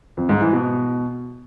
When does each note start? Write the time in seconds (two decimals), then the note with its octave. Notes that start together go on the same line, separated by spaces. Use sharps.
0.17 F2
0.29 G#2
0.41 E3
0.53 B2